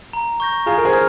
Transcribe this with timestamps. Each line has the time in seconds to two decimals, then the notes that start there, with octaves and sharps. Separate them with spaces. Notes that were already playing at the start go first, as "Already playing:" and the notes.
0.13 A#5
0.40 C#6 G6 A#6
0.66 F4 G#4 A#5
0.78 A#4
0.85 G#4 C5
0.93 F6 G#6